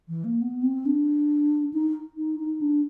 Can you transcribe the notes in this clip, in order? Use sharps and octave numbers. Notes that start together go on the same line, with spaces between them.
E3
A#3
B3
C4
D4
D#4
D#4
D#4
D4